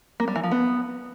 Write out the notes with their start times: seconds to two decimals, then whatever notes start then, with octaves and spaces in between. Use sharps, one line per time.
0.20 A#3
0.28 G3
0.36 E3
0.44 F3
0.51 B3